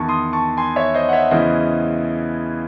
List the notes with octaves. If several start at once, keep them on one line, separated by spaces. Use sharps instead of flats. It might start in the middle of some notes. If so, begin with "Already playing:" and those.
Already playing: E2 D#3 A5 C#6
C6 D#6
A5 C#6
G#5 C6
C#5 E5
C5 D#5
F#5
C#5 E5
E2 C#3 E3 C5 D#5